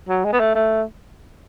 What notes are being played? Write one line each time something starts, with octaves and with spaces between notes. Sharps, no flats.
F#3
G#3
B3
A3
A3